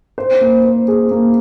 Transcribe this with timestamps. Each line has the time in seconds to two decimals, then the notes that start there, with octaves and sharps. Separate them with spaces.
0.18 C5
0.41 A#3
0.65 C5
0.88 G#4
1.11 A#3